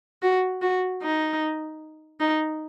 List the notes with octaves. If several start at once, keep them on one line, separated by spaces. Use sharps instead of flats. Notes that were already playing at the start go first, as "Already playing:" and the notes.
F#4
F#4
D#4
D#4